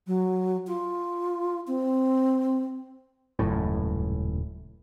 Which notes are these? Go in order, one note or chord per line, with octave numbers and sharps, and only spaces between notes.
F#3
F4
C4
D#1 C#2 F#2 A2